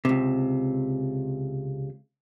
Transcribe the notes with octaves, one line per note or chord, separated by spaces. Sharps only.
C#2 C3